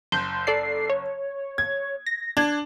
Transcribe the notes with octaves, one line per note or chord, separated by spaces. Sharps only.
F#1 C6 G6
A4 D5 C7
C#5
G#6
A#6
D4 G#6